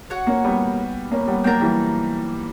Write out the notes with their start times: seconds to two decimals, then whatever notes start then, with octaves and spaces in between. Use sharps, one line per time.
0.10 F#4 C#5 F#5
0.27 A#3 C#4
0.44 G3 B3
1.11 A#3 C#4
1.27 G3 B3
1.44 F#3 A#3 D4 A#4 D5 G5
1.61 E3 G3